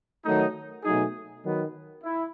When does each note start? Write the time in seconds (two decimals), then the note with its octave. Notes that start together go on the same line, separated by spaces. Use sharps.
0.25 D#3 F#3 A3 D#4
0.84 B2 F#3 A3 D#4 G#4
1.43 D#3 F#3 B3
2.03 E4